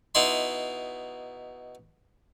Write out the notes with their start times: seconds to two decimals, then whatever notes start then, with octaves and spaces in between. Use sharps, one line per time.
0.15 B2 D#4 E4 C6